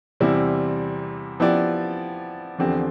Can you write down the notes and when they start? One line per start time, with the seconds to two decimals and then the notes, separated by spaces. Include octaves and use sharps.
0.20 E2 C3 G3 C4 E4
1.40 F3 B3 E4 G4 D5
2.58 E2 D3 F3 C4 G4